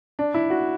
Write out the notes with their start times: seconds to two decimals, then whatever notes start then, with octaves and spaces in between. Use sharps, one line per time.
0.19 D4
0.34 E4
0.50 F#4